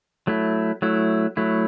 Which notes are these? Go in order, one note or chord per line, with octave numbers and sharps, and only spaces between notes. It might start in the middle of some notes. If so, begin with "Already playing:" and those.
F#3 A3 E4
F#3 A3 E4
F#3 A3 E4